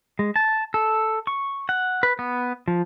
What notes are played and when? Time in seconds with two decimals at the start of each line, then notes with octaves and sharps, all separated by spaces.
0.19 G#3
0.36 A5
0.74 A4
1.27 C#6
1.69 F#5
2.03 B4
2.19 B3
2.68 F3